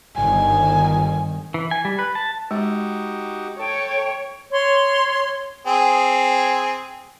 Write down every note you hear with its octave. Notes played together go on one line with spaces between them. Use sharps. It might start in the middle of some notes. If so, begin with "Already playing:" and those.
G1 D#3 G#5
E3
G#5
G3
B4
A5
G#3 D#4 F#4 G4
A4 C#5 G5
C#5 C6
C4 G#4